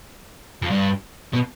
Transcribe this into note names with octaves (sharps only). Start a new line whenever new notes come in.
F2
G2
B2